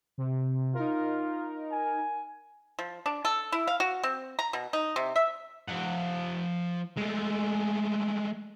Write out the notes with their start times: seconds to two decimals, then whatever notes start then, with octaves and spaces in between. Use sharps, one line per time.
0.18 C3
0.75 D#4 F4 A#4
1.72 G#5
2.79 F3
3.06 D4
3.25 A4
3.52 E4
3.67 F5
3.80 F#4
4.03 C4
4.39 A#5
4.53 B2
4.73 D#4
4.96 C3
5.16 E5
5.69 F3 F#5
6.97 G#3 A3